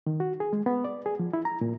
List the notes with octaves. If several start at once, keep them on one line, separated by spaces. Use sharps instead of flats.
D#3
F#4
G#4
G#3
B3
D5
G#4
F3
E4
A#5
A#2